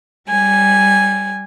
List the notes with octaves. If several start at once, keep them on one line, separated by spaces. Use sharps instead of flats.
G3 G#5